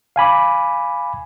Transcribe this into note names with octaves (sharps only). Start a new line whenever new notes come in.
F5 G#5 B5 D6